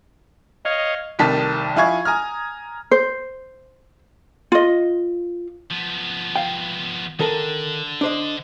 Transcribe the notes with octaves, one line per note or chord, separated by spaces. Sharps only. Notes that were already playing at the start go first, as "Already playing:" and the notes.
C#5 D#5 F5
F1 C2 D#3 A5 B6
F3 E4 F5 G#5 C#6 G#6
G#5 A#5 D#6 F6
C5
F4 D#5
F3 B3
F5 G5
D3 D#3 A4 A#4
D4 C5 D#5